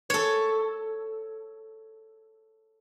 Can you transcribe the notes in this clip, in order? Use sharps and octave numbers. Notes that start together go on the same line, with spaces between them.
A4 C#5